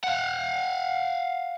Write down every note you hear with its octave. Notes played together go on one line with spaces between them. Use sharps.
F5 F#5